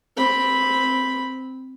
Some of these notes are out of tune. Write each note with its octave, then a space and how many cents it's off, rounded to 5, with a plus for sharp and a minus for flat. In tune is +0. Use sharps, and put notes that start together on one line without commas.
C4 +0 B5 +0